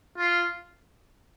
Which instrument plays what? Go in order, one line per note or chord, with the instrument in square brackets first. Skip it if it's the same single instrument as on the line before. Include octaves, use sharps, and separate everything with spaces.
[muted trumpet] F4